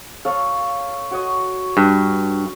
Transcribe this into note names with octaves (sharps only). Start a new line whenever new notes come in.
A4 C#5 F5
F#4 C#5 D#5
G2